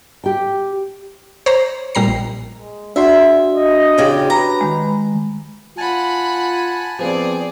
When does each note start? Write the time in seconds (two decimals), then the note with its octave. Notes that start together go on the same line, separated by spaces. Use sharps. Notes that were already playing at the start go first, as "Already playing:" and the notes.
0.24 G4 G5
1.46 C5 C#5 A#5
1.95 A#2 G3 A#5 C7
2.07 A#1
2.56 G#3
2.96 D4 F#4 G#4 E5 C6
3.55 D#5
3.98 E2 C#3 G4
4.30 B4 A#5
4.61 D#3 G#3
5.78 F4 F#5 G#5 A5 B5
6.99 F3 B3 C4 G#4 D5